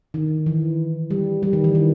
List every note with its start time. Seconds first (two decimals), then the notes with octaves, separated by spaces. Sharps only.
0.14 D#3
0.46 E3
1.10 G3
1.43 G3
1.53 D#3
1.64 E3
1.75 D#3